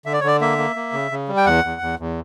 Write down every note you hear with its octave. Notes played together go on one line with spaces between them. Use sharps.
D3 E5
D5
C#5
D3 D5
A#3 E5
A#3
A#3
C#3
C#3
G3
G5
E2 F#5
E2
E2
E2